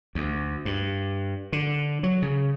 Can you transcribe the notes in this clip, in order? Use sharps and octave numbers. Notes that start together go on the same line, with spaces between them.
D2
G2
D3
F#3
C#3